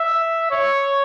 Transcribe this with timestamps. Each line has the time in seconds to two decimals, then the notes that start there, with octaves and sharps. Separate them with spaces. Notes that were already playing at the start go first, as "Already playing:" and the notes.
Already playing: E5
0.51 C#5